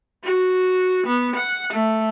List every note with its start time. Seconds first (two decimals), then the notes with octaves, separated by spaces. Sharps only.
0.24 F#4
1.06 B3
1.36 F#5
1.73 A3